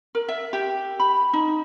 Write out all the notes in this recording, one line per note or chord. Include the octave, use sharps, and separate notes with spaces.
A#4
E5
G4
B5
D#4